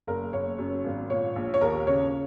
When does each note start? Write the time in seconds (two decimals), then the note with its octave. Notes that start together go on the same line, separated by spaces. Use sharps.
0.07 F#1 A#4
0.33 F#1 C#5
0.58 F#2
0.84 G#1
1.10 A#2 C#5
1.36 A#1
1.54 C#5
1.61 D#2 A#4
1.87 C#3 C#5